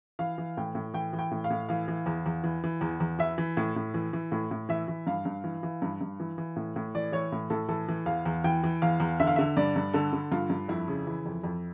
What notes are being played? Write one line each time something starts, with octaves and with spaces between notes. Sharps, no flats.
E3 F5
E3
A2 G5
A2
E3 G5
E3
G5
A2
F5
A2
E3 F5
E3
E2
E2
E3
E3
E2
E2
E3 E5
E3
A2
A2
E3
E3
A2
A2
E3 E5
E3
G2 F5
G2
E3
E3
G2
G2
E3
E3
A2
A2
E3 D5
E3 C#5
A2
A2 A4
E3 A4
E3
E2 F5
E2
E3 G5
E3
E2 F5
E2
D3 E5
F5
D3 E5
G2 D5
G2
D3 A4
D3
G2 F4
G2
F2 E4
C#3
E3
F2
F2